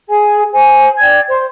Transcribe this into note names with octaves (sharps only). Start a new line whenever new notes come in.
G#4 G#5
C5 G#5
D5 G5 G#6
C5 C6